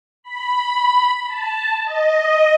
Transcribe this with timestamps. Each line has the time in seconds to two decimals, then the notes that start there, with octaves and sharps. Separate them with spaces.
0.23 B5
1.26 A5
1.84 D#5